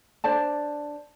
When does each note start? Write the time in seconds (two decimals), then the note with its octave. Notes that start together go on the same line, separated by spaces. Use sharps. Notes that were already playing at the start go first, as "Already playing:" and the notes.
0.24 D4 C5 D5 A5